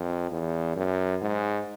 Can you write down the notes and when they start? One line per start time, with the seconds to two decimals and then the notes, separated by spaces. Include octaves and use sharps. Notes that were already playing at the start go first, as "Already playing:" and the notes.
Already playing: F2
0.31 E2
0.76 F#2
1.22 G#2